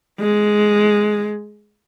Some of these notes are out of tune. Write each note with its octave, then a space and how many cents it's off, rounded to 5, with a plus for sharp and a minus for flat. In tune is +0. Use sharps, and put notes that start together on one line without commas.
G#3 +5